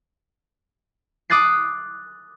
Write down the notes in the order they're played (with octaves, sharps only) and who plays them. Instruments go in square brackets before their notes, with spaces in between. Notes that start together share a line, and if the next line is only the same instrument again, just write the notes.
[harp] D6 D#6 F#6 A6 C7